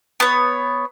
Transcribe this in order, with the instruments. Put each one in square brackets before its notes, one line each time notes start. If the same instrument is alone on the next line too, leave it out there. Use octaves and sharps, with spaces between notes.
[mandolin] B3 C#5